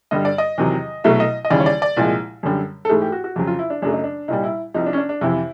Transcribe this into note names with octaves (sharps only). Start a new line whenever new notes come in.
G2 D3 G3 D#5
D5
D#5
E2 C3 D#3 F#3
C2 B2 F#3 A3 E5
D#5
D#5
D#2 C#3 E3 G3 D5
C#5
D5
D5
C2 A#2 F3 G#3
F#2 D3 G3
A4
G#2 E3 A3 G#4
G4
F#4
F#4
F2 C#3 F#3
F4
E4
D4
F#2 C#3 F#3 A3 D4
D#4
D4
C2 A#2 G3 D#4
E4
C2 C3 F3 D#4
D4
C#4
D4
D4
F2 C3 E3 E4